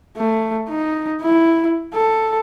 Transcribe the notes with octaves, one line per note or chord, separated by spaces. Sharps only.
A3
D#4
E4
A4